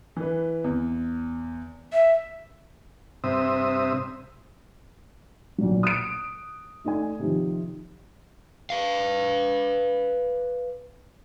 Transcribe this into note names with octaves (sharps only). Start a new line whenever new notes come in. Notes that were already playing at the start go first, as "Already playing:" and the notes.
E3 B4
E2
E5
G2 C3 C4 E5 D#6
B1 A#2 F#3
D#6 F#6 D7
A3 D#4 D5 G#5
C3 D#3 F3
B4 F5